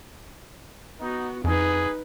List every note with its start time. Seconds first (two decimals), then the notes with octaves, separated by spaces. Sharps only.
0.99 B3 D#4 F#4
1.44 F2 D#4 G#4 B4